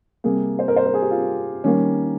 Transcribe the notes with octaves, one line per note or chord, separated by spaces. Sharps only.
C3 G3 A#3 G#4
C5
A#4
C5
A#4
G#4
G4
F4
D#3 G3 A#3 C#4